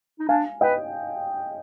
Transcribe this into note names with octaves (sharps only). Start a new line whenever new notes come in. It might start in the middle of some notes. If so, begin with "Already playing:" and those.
D#4
D4 F5 G#5
B4 D#5 G5